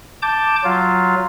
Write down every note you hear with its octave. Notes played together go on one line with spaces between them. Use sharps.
A5 D6 G6
F#3 F4